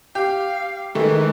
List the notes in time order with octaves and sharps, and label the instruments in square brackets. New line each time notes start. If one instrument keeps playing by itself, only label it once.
[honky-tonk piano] G4 [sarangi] F5
[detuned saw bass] D#3 [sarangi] E3 [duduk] G#3 [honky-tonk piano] A3